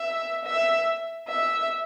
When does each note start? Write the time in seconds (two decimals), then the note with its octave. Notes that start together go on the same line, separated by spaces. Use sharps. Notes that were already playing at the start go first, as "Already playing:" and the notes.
Already playing: E5
0.45 E5
1.28 E5